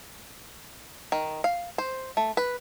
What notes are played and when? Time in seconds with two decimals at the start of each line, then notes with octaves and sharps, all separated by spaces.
1.12 D#3
1.44 F5
1.78 C5
2.17 A3
2.37 B4